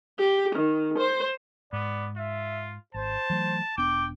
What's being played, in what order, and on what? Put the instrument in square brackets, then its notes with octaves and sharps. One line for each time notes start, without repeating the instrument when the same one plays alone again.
[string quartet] G4
D#3
C5
[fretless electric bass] G#2 [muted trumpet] B3 [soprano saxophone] D5
[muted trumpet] F4 [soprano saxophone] E5
[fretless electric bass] G#1 [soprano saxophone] C5 [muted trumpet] A5
[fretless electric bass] E3 F#3 A3
[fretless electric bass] E1 B3 D4 [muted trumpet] G5 [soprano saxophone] D6